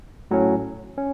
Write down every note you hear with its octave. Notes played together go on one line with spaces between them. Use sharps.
A2 F#3 C#4
C#4